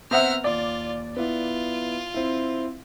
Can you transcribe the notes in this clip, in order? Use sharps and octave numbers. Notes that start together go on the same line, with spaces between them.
B3 C4 E5 F#5 A#5 F6
D#2 F4 D5
B3 E4 F4
C4 E4